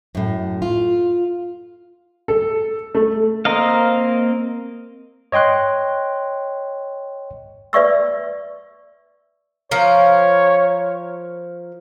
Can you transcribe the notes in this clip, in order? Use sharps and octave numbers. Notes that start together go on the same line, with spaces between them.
F#2 A2
F4
A4
A3
A#3 C4 A#4 D#5 F5
C#5 D#5 G5 C6 F#6
B4 D5 E5 C#6 E6
F3 A#4 C#5